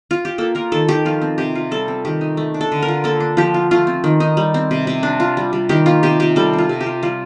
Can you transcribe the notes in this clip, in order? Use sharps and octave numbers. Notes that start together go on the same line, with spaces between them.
F4
G4
A#3 A4
F4 A#4
D#3 A4
D#3 G4
F3 F4
C4
C3 G4
F4
G3 A4
C4
D#3 G4
D#4
A3
D4
A4
D3
A#4
F4
A#3 A4
D4
F3 G4
F4
A3 F4
C4
D#3
D#4
G3
C4
C3
C3
D4
F4
G3
G3
D#3 G4
A#3 F4
C3 G4
C3 G4
G3 A4
C4
F4
C3
G4
F4
G3 F4